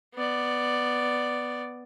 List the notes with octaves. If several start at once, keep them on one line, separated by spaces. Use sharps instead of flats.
B3 D5